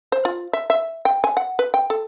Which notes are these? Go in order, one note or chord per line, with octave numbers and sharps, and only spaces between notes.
C5
F4
E5
E5
G5
G#5
F#5
B4
G5
A4